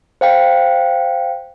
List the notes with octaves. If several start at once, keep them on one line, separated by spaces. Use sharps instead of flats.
C5 F5 G5